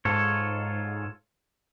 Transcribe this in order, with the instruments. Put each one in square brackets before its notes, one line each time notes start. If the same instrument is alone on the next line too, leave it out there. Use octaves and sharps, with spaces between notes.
[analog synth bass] G#2 [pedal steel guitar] F4 A4 C#5